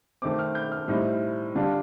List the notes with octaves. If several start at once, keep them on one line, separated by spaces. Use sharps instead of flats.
D#3 A3 C4 D6
F6
G6
F6
A2 G3 C4 D#4
D3 G3 D4 F4